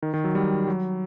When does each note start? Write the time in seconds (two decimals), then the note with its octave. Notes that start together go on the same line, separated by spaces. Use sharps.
0.03 D#3
0.14 D#3
0.24 F#3
0.35 G3
0.67 F#3